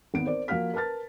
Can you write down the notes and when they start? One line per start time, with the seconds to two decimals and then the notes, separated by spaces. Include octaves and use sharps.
0.14 G#1 B3 D7
0.26 A#4 C5 D5
0.48 F3 A#3 F#4 F5 F6 B6
0.74 A#4 B4 A5 F6 A6